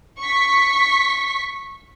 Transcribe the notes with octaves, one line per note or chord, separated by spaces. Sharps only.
C#6 B6